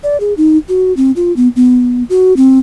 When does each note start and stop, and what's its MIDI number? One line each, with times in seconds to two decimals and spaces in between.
0.04 0.20 74
0.20 0.34 68
0.37 0.58 63
0.69 0.93 66
0.97 1.11 60
1.16 1.35 65
1.36 1.48 59
1.56 2.03 59
2.10 2.36 66
2.37 2.59 60